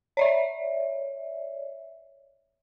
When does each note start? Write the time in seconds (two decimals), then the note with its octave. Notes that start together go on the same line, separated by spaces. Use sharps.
0.17 C#5 D5 E5